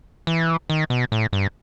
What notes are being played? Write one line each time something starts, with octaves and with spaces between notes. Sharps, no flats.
E3
D#3
B2
A2
G2